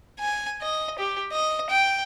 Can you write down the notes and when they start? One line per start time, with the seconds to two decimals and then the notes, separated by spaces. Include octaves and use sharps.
0.19 G#5
0.61 D#5
0.99 G4
1.32 D#5
1.70 G5